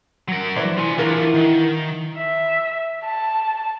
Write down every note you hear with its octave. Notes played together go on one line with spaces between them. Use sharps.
F#3 A#4
E3 D4 C5
F4 G#5
E3 D4 F4 F#4 A#4
D#3
E5
A5